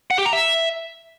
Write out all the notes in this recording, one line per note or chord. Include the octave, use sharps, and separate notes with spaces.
F#5
G4
A#5
E5